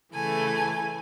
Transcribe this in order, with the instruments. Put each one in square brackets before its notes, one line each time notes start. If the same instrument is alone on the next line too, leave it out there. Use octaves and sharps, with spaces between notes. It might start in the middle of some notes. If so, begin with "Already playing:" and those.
[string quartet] C#3 E3 A3 G#5